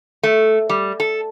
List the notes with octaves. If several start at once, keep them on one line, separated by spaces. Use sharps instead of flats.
A3
G3
A4